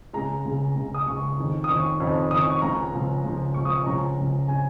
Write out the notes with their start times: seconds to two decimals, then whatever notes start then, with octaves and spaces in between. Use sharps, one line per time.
0.13 C#2 C#3 G#3 A#5
0.45 C#2 C#3 G#3
0.75 C#2 C#3 G#3
0.94 D#6
1.06 C#2 C#3 G#3 C#6
1.37 F2 D#3 C#4
1.64 D#6
1.69 F2 D#3 C#4 C#6
2.00 F2 D#3 C#4
2.31 F2 D#3 C#4 D#6
2.41 C#6
2.52 C#6
2.62 C#2 C#3 F3 A#5
2.93 C#2 C#3 F3
3.24 C#2 C#3 F3
3.54 C#2 C#3 F3 C#6
3.65 D#6
3.76 C#6
3.86 C#2 C#3 F3 C#4 A#5
4.17 C#2 C#3 F3 C#4
4.48 C#3 F3 C#4 G#5